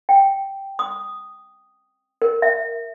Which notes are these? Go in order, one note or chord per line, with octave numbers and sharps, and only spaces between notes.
G5
D#6
A#4
E5